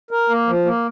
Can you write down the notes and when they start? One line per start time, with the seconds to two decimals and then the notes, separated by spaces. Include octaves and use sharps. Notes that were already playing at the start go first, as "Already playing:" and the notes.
0.11 A#4
0.29 A#3
0.47 F3
0.65 A#3